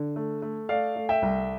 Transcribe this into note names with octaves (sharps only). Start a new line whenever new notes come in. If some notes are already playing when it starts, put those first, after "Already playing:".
Already playing: D3
A3
A3
A3 D5 F5
A3
E5 G5
C2